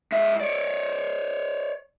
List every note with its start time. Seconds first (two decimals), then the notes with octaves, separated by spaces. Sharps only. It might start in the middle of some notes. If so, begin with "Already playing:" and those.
0.12 G#2 E5
0.40 C#5 D5